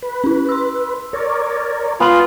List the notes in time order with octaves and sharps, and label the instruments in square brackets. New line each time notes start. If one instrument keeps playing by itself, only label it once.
[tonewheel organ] B4
[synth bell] C#4 E4
C6 E6
[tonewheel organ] A#4 C#5 D5
[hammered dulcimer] B3 [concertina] F4 [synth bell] G#5 F#7